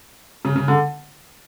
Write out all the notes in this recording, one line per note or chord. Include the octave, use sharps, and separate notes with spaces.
C#3
C#3
D3